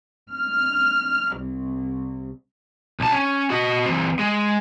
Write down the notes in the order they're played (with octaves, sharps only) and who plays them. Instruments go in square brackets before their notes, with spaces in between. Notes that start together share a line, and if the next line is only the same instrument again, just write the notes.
[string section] F6
C2
[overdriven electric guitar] B1 A5
C#4
F#4 D#5
E3 C4
G#3